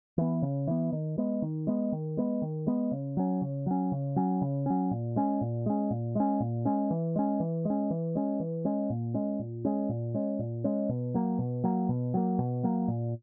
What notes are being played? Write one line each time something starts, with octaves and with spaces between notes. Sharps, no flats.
E3 B3
C#3
E3 B3
D#3
G#3 B3
D#3
G#3 B3
D#3
G#3 B3
D#3
G#3 B3
C#3
F#3 C#4
C#3
F#3 C#4
C#3
F#3 C#4
C#3
F#3 C#4
A#2
G#3 C#4
A#2
G#3 C#4
A#2
G#3 C#4
A#2
G#3 C#4
E3
G#3 C#4
E3
G#3 C#4
E3
G#3 C#4
E3
G#3 C#4
A#2
G#3 C#4
A#2
G#3 C#4
A#2
G#3 C#4
A#2
G#3 C#4
B2
F#3 A#3
B2
F#3 A#3
B2
F#3 A#3
B2
F#3 A#3
A#2